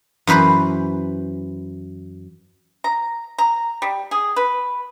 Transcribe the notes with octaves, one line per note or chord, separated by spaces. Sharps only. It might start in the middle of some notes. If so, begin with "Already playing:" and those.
F#2 E3 B4 C5 B5
A#5
A#5
G3
G#4
B4